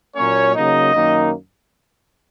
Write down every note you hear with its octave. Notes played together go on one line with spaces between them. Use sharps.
A#2 F#3 A#3 C#4 C#5
C#3 F#3 A#3 D#4 D#5
F#2 D#3 A#3 D#4